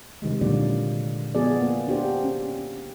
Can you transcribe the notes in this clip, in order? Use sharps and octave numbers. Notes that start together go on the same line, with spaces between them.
C3 D#3 G3 G#3
A#2 D3 D#3 F#3 A#3 D5
F3 B3 F#4 G#4 D5
A#3
D4 F#4 G4 C5
C#4